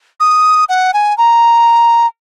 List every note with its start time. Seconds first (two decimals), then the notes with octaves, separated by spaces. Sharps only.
0.20 D#6
0.69 F#5
0.94 G#5
1.18 A#5